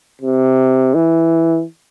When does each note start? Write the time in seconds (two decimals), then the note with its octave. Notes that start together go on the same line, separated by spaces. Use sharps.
0.22 C3
0.95 E3